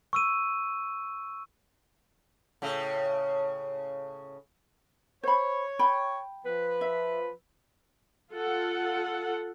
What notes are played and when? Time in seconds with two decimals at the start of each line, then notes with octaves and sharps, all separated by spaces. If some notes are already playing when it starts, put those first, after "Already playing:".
0.13 C#6 E6 D#7
2.62 A2 C#3
5.23 C5 C#5 B5
5.79 G5 B5
6.45 F3 B4
6.81 E5
8.32 F4 A4 F#5